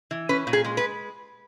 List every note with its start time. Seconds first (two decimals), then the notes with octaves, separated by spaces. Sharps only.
0.11 E3
0.29 C#4 B4
0.47 A#2
0.53 G#4
0.65 G#3
0.77 B4